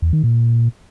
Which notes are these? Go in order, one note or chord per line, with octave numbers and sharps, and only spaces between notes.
E2
D#3
A#2